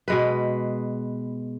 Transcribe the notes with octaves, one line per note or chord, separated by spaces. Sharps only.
B2 G#3 B4